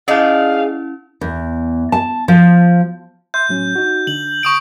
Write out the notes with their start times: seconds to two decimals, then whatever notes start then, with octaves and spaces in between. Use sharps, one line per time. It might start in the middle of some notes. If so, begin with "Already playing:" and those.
0.08 C#4 D#4 E4 G#4 D5 F5
1.21 E2
1.92 A5
2.28 F3
3.34 E5 C6 G6
3.49 A2 F#3 C#4
3.76 D#4 F#4
4.07 D3 F#7
4.43 C#6 D#6 D7